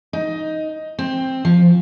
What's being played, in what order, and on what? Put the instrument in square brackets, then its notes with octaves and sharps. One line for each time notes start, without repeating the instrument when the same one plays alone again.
[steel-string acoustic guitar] D#4
C4
F3